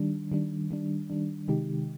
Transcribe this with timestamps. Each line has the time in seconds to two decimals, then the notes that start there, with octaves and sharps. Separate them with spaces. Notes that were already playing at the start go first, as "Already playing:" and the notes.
Already playing: D#3 G3 D4
0.32 D#3 G3 D4
0.71 D#3 G3 D4
1.10 D#3 G3 D4
1.48 C3 D#3 G#3 D#4 G4